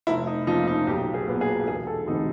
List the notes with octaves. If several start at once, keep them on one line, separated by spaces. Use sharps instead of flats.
F1 E4
D#4
F2 C#3 F3 A#3 D#4
D#4
B1 G4
G#4
A#2 F#3 B3
G#4
E1 G#4
A4
D2 C3 E3 D#4